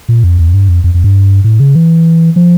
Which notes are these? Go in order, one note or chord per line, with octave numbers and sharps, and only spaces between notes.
A#2
F2
E2
F2
G2
F2
F2
F2
G2
A2
C#3
E3
F3